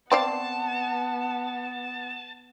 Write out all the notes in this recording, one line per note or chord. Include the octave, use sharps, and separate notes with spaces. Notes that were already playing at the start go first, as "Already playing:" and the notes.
B3 C4 D5 F5 A5